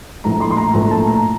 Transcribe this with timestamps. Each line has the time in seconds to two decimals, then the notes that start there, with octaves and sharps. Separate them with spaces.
0.24 A#1 A2 F3 A3 A#5
0.40 C6
0.50 C6
0.57 A#5
0.74 A#1 A2 F3 A3 A#5
0.91 A5
1.08 A#5